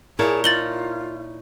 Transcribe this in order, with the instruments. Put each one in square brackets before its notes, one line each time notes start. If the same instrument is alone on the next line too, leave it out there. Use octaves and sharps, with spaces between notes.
[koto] A#2 C#5 A5 [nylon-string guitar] E4 A#4 [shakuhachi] G#4
[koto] D#4 [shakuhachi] F4 [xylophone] A6 F#7 G7